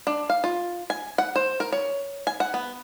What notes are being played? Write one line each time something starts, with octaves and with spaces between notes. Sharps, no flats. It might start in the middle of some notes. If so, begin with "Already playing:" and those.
D4
F5
F4
G#5
F#5
C5
A#4
C#5
G#5
F#5
B3